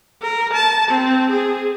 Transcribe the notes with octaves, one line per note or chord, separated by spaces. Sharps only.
A#4
A5
C4
G#4